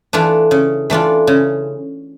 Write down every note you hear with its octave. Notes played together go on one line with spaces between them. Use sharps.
E3 A3 D4 F4
C#3
E3 A3 D4 F4
C#3